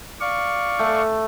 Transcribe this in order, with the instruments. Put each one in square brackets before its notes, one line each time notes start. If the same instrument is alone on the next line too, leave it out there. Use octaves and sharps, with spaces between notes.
[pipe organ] D5 F5 C#6
[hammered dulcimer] A3